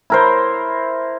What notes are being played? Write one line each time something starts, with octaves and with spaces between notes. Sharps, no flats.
E4 A#4 C5